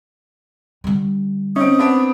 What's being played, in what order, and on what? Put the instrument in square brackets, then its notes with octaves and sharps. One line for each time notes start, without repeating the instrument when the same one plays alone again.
[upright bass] D3 G3
[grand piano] C4 D#4 [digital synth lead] C#4 [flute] D#6
[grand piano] B3 C4 D4